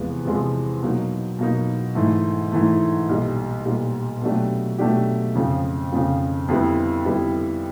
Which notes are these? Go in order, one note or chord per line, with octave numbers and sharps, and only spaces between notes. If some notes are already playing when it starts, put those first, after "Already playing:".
Already playing: E2 C3 F3 G#3 B3
E2 C3 F3 G#3 B3
B2 F#3 A#3 D#4
B2 F#3 A#3 D#4
G#2 E3 A3
G#2 E3 A3
B1 A#2 G3
B1 A#2 G3
B2 F#3 A3 D4 G4
B2 F#3 A3 D4 G4
F2 C#3 F3
F2 C#3 F3
F2 D3 G3 B3 E4
F2 D3 G3 B3 E4